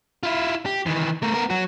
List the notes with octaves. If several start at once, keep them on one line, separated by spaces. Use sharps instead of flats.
E4 F4
G4
D#3 E3
A3 A#4
B3 A#4
F#3 F#4